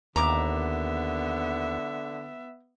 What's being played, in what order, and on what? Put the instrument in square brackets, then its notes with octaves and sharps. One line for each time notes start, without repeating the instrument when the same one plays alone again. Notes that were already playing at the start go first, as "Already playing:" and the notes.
[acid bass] D#2 [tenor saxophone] D3 [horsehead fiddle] B3 E5 [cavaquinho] A#5 D6